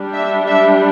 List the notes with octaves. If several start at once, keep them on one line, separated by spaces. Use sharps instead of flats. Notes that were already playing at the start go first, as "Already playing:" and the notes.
Already playing: G3 D4
E5
E5